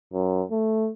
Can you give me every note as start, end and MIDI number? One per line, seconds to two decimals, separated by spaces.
0.13 0.43 42
0.51 0.90 57